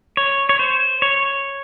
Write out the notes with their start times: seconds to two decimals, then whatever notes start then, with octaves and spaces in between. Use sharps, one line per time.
0.17 C#5
0.49 C#5
0.59 C5
1.02 C#5